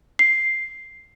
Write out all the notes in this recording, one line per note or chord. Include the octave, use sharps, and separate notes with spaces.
C7